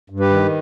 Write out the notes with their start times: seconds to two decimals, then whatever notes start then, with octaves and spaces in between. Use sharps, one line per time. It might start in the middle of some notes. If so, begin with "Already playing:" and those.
0.10 G2
0.20 G4 B4
0.30 D#3